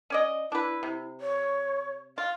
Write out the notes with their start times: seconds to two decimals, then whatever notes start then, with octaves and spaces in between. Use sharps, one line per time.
0.10 C#4 D5 D#5
0.52 D4 E4 B4
0.83 C3
1.21 C#5
2.18 F4 F5